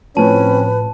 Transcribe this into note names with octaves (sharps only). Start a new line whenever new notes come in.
A2 F3 C4 C#4 B4 A5